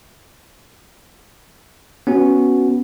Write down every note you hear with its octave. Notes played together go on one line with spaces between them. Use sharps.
B3 C#4 F#4